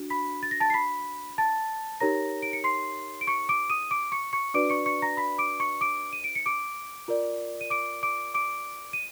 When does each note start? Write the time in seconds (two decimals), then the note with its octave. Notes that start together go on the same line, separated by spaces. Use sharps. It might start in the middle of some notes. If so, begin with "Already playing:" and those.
Already playing: D4 F#4
0.10 B5 B6
0.43 A6
0.51 A#6
0.60 A5 A6
0.70 C7
0.74 B5 B6
1.38 A5 A6
2.00 D#4 G4 A#4 C#5 A#5 A#6
2.42 D7
2.53 C#7
2.64 C6 C7
3.21 D7
3.27 C#6 C#7
3.49 D6 D7
3.70 D#6 D#7
3.91 D6 D7
4.12 C#6 C#7
4.33 C#6 C#7
4.54 D4 F#4 B4 D5 D6 D7
4.70 C#6 C#7
4.86 C#6 C#7
5.02 A#5 A#6
5.17 B5 B6
5.38 D6 D7
5.60 C#6 C#7
5.81 D6 D7
6.13 D#7
6.24 D7
6.35 C#7
6.46 D6 D7
7.08 F4 A#4 D5
7.61 D#7
7.70 D6 D7
8.03 D6 D7
8.34 D6 D7
8.93 D#7